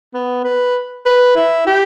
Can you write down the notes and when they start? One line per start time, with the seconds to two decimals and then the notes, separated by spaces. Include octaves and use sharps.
0.14 B3
0.44 B4
1.06 B4
1.36 E4
1.66 G4